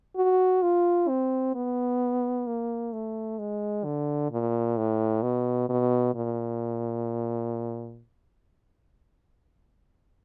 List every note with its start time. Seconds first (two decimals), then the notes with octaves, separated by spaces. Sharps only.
0.17 F#4
0.62 F4
1.08 C4
1.55 B3
2.47 A#3
2.93 A3
3.39 G#3
3.85 D3
4.31 A#2
4.77 A2
5.23 B2
5.69 B2
6.15 A#2